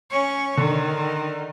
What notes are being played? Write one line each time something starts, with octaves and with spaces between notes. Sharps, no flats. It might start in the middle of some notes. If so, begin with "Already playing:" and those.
C#4 C#5
D3 D#3